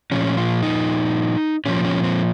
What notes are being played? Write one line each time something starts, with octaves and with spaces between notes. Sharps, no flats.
A#2 F3 C#4
F4
D#4
A#2 F3 C#4
C#4
C4